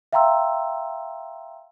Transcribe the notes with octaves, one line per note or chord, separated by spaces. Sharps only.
E5 F5 G5 A#5 C6 E6